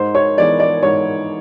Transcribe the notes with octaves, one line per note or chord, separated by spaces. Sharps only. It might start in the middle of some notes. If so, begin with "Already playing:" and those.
Already playing: G#2 C5
C#5
E3 G#3 B3 D5
D5
G#2 C#5